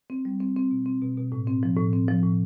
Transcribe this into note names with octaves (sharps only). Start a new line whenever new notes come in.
C4
G3
C4
C4
B2
C4
B2
B2
A2
C4
F3
A2
C4
F3
A2